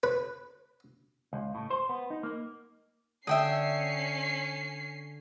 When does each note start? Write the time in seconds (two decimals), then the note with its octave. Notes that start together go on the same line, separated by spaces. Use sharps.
0.03 B4
1.33 C#2
1.55 A2
1.70 C5
1.89 B3
2.10 D#4
2.23 A#3
3.27 D3 C#4 E5 G5 D#6 C7